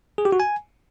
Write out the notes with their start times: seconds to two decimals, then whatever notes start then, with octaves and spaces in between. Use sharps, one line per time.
0.18 G#4
0.25 G4
0.32 F#4
0.40 G#5